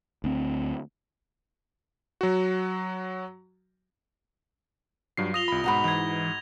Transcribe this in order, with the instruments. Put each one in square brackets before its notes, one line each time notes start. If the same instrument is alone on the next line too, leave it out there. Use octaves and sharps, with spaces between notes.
[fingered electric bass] D2 C4
[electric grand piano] F#3 F#4
[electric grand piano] G2 F#3 C7 [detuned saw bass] F4
[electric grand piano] D#6 [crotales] A#6 F7 G7
[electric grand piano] C2 B5
[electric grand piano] G#2 B2 [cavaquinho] D#4 F#4 B5
[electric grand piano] G#2 [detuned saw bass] E3 [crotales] G#6 F7